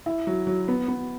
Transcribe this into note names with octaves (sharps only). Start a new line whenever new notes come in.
E4
F#3
F#3
B3
B3